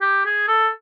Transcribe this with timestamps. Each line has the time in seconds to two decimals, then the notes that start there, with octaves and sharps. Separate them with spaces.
0.02 G4
0.26 G#4
0.48 A4